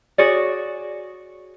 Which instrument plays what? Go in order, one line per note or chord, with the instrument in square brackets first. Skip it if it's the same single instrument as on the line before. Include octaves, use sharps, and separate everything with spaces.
[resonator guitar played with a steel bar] F#4 G#4 C#5 D5